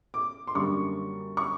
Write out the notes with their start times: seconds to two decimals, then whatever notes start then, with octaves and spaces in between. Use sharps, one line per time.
0.14 D6
0.47 C6
0.55 F#2 D3 G3 A#3 C#6
1.37 C#6